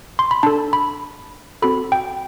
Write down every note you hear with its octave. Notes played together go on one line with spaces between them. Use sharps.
C6
B5
D4 A4 A5
B5
C4 F#4 A4 B5
G5